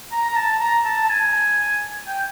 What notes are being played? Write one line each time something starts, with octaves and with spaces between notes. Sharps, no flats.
A#5
A#5
A5
A#5
A5
A5
G#5
G5